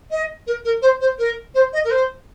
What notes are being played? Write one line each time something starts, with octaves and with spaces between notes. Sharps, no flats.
D#5
A#4
A#4
C5
C5
A#4
C5
D#5
A#4
C5